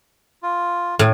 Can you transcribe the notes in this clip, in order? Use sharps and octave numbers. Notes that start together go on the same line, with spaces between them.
F4
A2